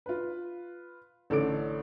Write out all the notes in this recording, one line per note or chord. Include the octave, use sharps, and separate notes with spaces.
F4 B4
A1 D3 C#4 A4 D6 D7